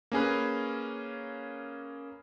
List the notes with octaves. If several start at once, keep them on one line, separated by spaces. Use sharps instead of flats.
A#3 C#4 G#4 B4